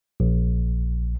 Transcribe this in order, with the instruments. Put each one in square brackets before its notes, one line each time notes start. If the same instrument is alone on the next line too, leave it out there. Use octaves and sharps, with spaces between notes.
[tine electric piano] A#1